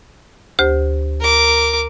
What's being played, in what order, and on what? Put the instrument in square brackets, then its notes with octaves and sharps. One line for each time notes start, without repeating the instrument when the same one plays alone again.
[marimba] D2 G4 C5
[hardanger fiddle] A#4 D6